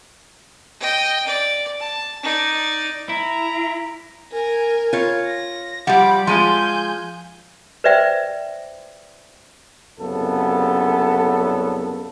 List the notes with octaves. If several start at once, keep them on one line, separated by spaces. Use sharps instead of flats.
D#5 G5
D5
A5
D#4 D5
E4 A#5
A#4 G#5
F4 C#5
A#6
F3 G3 F#5 B5 D6
F3 G#3 F4 G#5 C6 G6 D#7
B4 C5 D5 E5 G5
C2 F#2 C#3 B3 A4